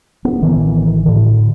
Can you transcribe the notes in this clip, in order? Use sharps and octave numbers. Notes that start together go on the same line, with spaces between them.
B3
A1 D#3 E3
A2 D3